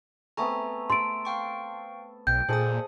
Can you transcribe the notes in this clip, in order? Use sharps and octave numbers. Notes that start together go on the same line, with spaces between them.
A3 B3 C4 E5 G#5 A#5
A3 A5 C6 E6 D7
F5 G5 C#6
B1 G5 G6
A#2 G#4 A4 C5 D#5 D#6